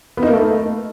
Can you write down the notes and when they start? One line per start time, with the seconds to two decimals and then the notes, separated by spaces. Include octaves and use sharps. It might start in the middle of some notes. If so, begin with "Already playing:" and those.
0.17 B3
0.23 D#4
0.28 A#3
0.33 A3